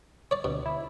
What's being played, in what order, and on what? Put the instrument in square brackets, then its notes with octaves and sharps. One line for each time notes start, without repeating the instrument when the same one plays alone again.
[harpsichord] C#5 D5
[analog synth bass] D2 [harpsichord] B2
[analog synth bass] E4